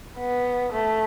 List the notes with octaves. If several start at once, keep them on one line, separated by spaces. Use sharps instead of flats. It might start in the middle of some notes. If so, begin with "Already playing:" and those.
B3
A3